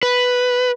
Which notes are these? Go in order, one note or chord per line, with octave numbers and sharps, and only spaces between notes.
B4